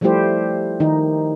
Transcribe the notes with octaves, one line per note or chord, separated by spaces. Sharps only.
F3 G3 A3 E4 G4 C5
D#3 D#4